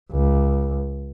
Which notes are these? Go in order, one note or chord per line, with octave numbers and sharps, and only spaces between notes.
C#2